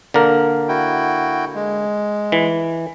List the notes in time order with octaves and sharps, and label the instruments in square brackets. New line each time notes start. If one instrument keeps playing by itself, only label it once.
[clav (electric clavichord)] D3 A#3 A#4
[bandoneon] E4 F#4 G5
G#3
[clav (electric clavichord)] E3